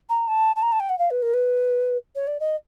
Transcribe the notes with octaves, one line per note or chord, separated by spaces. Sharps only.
A#5
A5
A5
A#5
A5
G5
F#5
F5
B4
A#4
B4
C#5
D5
D#5